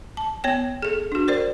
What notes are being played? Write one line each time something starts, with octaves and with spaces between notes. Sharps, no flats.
A5
B3 C#5 G5
G#4 A4
D4 F#4
A#4 C5 D5